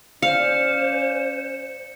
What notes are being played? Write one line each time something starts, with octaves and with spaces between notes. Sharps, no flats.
C#4 C5 D5 F5 C#7